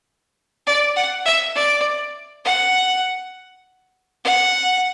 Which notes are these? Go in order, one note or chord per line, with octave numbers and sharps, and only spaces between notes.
D5
F#5
E5
D5
F#5
F#5